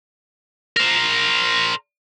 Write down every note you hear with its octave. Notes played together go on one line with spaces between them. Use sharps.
A#4 C5